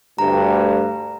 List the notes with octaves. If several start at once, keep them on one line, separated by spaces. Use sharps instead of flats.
D2 G2 A#5